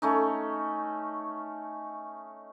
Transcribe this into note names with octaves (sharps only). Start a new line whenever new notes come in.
A3 C#4 D#4